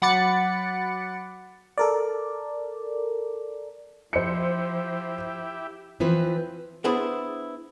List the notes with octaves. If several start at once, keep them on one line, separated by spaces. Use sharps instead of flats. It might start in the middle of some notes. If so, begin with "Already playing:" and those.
F#3 F#5 B5 D6 A6 C#7
A4 A#4 D5
F3 E4 G4 C5 C#7
E3 F3 C4 B4
B3 D4 E4 G#4 B4 C5